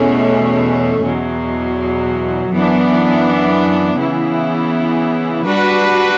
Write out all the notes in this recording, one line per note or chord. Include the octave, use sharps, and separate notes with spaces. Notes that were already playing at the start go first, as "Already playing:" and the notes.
Already playing: E2 B2 A3 C#4
E2 B2 F#3
F#2 E3 B3 D4
C#3 E3 B3 E4
G3 D4 F#4 B4